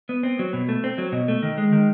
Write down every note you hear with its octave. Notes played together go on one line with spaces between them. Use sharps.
B3
C4
F#3
B2
A3
C4
F#3
B2
A3
D#3
G#3
D#3